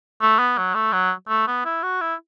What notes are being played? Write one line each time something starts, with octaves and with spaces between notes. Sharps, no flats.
A3
B3
F#3
A3
F#3
A3
B3
E4
F#4
E4